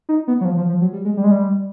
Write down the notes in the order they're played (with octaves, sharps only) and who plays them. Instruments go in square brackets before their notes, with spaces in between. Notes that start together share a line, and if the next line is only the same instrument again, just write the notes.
[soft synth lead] D#4
B3
F#3
F3
F3
F3
F#3
G3
G#3
G3
G#3
G3